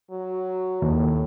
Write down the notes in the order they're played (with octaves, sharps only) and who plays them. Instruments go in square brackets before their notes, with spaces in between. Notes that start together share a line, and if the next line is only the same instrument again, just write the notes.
[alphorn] F#3
[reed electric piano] D#2 [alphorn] A2